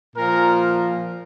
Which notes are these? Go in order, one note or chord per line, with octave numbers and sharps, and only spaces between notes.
A#2 F3 A#4